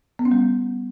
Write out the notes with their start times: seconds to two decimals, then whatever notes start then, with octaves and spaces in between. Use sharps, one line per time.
0.19 B3
0.25 C#4
0.31 G3